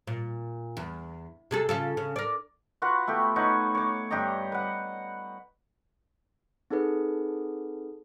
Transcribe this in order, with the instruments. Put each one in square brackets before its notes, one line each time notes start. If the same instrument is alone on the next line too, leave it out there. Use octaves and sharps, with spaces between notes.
[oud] A#2
E2
C3 G#4 A4
C#3 F4 A4
C#3
A#4 D5
[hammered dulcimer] F4 F#4 B4 F#5
A3 B3 G4
D#4 B4 C#5 F#5
C#5 D6
G2 G4 D#5 A#5
B4 F#5
[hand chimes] C4 D#4 G#4 A4 B4